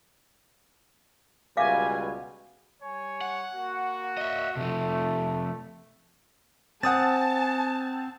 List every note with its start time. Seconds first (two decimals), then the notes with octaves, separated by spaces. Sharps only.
1.57 C#2 B2 G3 E5 F5 G#5 D6
2.83 G3 C#5 G#5
3.21 F#5
3.55 A#3 F#4
4.17 D#5 E5
4.57 C3 F3 A3
6.83 C4 F#5 G#5 A5 D#6 A6